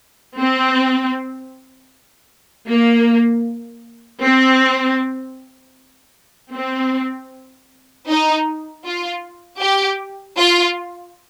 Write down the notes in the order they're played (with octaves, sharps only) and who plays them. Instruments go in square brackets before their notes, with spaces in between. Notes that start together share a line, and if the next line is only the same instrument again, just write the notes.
[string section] C4
A#3
C4
C4
D#4
F4
G4
F4